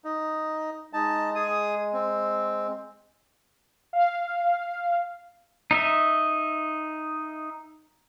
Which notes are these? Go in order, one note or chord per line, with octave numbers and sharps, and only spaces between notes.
D#4
G#3 D#4 A5
G#4 D#6
C4
F5
D#4 D#5 E5